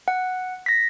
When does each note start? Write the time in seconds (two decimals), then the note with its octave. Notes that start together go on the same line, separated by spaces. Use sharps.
0.08 F#5
0.66 A#6 B6